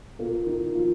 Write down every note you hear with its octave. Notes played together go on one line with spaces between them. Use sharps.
A#2 A#3
D#3 D#4
F3 F4